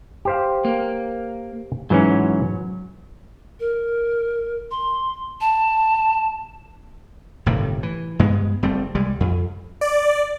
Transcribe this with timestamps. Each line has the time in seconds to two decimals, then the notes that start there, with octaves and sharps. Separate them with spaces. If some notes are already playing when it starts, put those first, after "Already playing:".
0.25 G4 C5 F5
0.65 A#3
1.90 G#2 E3 F#3 C#4
3.60 A#4
4.71 C6
5.41 A5
7.46 G1 A2 C3 D#3
7.83 E3
8.19 G2 G#3 B3
8.63 F#1 G3 A3 C4
8.95 C2 G3 G#3
9.20 F2
9.81 D5